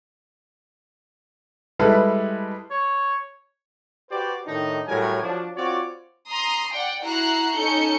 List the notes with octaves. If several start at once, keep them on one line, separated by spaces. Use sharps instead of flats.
G3 G#3 E4 A4 B4
C#5
F#4 G4 B4 C5 D5
A2 D#3 D4 D#4
A2 F#3 G3 A#4 G#5
F3 F#3 D4
C4 F4 F#4 C#5 D5
A#5 C6 D#6 C7
D5 F#5 G5
E4 F#4 A#5 F#6 C7
C#4 D#4 A4 G6 C#7